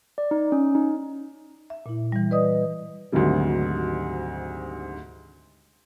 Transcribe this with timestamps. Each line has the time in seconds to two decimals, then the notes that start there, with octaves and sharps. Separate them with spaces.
0.18 D5
0.31 D#4
0.52 C#4
0.75 D#4
1.70 E5
1.86 A#2 E4
2.12 E3 G3
2.31 B4 D5 D#5 D#6
3.12 D2 G#2 C3 D#3 F#3 G3